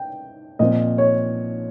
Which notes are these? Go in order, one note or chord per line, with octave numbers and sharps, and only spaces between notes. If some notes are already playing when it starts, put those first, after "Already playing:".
Already playing: G5
A#2 F3 C4 D#5
C#5